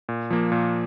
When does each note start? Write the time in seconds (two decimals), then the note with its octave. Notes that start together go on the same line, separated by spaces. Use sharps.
0.09 A#2
0.30 F3 A#3
0.52 A#2